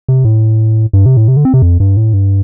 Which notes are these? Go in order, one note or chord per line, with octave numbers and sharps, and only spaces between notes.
C3
A2
G2
C3
A2
C3
D3
C4
C3
F2
G2
A2
G2